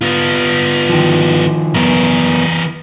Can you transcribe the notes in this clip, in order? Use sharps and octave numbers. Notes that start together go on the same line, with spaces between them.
B3 F4
D#3 F3
F#2 E3 B3 A#4